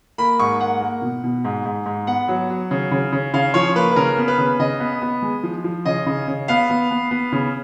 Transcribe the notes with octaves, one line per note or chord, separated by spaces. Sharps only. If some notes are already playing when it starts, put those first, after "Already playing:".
A#3 B5
G#2 C#6
A#3 F#5
A#3
B2
B2
G#2
G#2
G#2
B3 F#5
F#3
F#3
C#3
C#3
C#3
C#3 F5
F3 C#5
A#3 B4
B4
C#3 A#4
B3
B4
C#3
C#3 D#5
B3
B3
G#3
F3
F3
C#3 D#5
C#3
C#3
B3 F5
B3
B3
B3
C#3